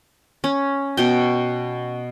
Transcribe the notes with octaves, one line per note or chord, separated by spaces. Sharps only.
C#4
B2 G5